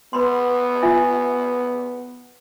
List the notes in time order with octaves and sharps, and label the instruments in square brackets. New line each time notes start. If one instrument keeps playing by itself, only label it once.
[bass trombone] B3 [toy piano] B4 B5 C6
[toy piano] F4 E5 G#5